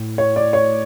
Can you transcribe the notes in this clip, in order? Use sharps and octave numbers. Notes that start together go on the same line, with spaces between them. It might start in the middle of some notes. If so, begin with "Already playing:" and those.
Already playing: A2
C#5
D5
C#5